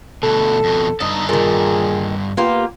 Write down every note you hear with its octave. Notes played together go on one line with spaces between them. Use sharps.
D2 B2 A4
F2 B2
G2 D#4 A4
A#2 D#3 G#4
A#3 B3 F4 G4